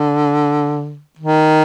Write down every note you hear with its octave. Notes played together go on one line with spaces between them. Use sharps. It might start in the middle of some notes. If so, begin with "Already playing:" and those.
Already playing: D3
D#3